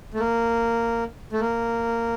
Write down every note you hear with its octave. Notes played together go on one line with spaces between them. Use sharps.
A3
A#3
A3
A#3